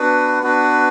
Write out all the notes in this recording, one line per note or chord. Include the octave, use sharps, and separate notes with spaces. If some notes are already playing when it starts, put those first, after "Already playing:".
Already playing: B3 D4 F#4 B4
B3 D4 F#4 B4